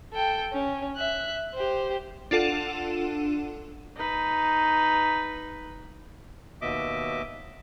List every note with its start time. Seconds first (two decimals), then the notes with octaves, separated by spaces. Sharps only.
0.14 A4 G5
0.53 C#4
0.96 E5 F#6
1.54 G4 C5
2.31 D4 F4 A4 F#5 D#7 E7
3.96 D#4 B4
6.61 D#2 B2 D#5 E5 D6